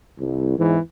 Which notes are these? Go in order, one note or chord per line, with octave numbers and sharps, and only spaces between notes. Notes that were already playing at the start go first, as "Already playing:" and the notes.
C2
E2 G#2 E3